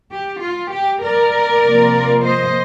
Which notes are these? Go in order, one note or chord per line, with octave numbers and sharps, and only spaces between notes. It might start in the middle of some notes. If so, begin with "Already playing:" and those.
G4
F4
G4
A#4 D5
C3 F3 A#3 F4
C5 D#5